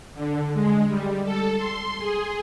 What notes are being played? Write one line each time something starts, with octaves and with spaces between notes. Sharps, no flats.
D3
G#3
G3
A4
C6
G#4